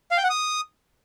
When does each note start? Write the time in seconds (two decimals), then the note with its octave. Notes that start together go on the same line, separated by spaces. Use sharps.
0.11 F5
0.17 G5
0.24 F#5
0.30 D#6